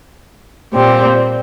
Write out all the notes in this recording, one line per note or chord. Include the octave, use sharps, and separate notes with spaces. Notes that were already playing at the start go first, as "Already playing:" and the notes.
A#2 G3 C4